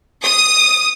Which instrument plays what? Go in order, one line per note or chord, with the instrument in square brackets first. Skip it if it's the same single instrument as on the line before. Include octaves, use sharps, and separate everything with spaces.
[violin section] D#6